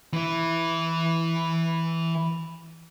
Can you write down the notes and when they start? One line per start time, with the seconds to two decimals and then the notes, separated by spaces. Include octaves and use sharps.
0.13 E3 E4